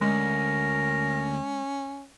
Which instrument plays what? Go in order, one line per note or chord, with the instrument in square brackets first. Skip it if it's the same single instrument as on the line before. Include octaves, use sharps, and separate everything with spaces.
[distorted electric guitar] D2 [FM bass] G#3 [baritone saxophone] C#4 [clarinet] A#4